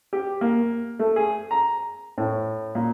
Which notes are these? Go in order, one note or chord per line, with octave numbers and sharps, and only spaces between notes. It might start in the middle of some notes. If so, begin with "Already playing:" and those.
G4
A#3
A3
G#4
A#5
A2
A#2